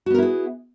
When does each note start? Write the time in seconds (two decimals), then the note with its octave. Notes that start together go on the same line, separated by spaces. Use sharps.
0.06 F#4
0.10 B3
0.14 A#4
0.18 E4
0.22 G#4